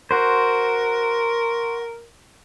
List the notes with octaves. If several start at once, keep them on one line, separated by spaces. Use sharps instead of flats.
F#4 A#4 C5